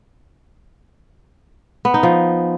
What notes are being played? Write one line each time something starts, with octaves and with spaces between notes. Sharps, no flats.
B3
D#4
F3